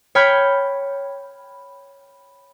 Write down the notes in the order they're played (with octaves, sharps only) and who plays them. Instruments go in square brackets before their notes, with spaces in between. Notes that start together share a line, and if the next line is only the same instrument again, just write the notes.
[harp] C#5 G5 B5 F6 G6 G#6